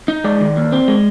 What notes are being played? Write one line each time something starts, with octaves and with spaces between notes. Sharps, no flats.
D#4
G#3 D5
D#3
D#2
C4
G#3